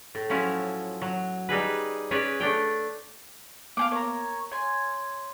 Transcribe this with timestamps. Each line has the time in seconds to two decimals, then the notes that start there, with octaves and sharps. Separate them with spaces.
0.15 A2
0.30 F3 F#3 C#4 E4
1.02 F#3
1.49 G3 D#4 G#4 B4
2.11 C#4 G#4 B4 C#5 D5
2.40 A3 D4 G5
3.77 A#3 B3 F5 G#5 D6
3.91 A#4 C#5 A#5
4.52 C#5 G#5 C6 G#6